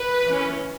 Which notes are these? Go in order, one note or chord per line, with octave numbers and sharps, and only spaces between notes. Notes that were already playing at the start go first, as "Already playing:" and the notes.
Already playing: B4
E3 C#4